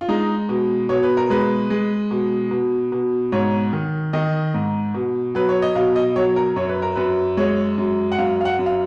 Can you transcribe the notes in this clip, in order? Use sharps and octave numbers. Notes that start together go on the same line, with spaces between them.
F4
G#3 D#4
B2
B2 C#5
B4
A#4
G#3 B4
G#3
B2
B2
B2
G#2 C#5
D#3
D#3 D#5
G#2
B2
F#3 B4
C#5
D#5
B2 F5
D#5
F#3 C#5
A#4
F#2 C#5
B4
A#4
F#2 B4
G#3 C#5
F#2
F#5
F#2 F5
F5
F#5
F#2
F5